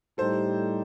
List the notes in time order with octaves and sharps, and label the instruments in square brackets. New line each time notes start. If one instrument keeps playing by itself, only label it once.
[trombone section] A2 G3 D#4 G4 [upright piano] A4 C5